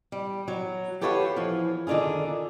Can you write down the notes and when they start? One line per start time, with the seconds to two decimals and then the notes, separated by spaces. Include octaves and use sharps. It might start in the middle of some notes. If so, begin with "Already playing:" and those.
0.12 G3
0.48 F#3
1.01 G4 A4 B4 C#5 F5 F#5
1.36 E3 F3
1.87 D3 D#3 D4 F4 G#4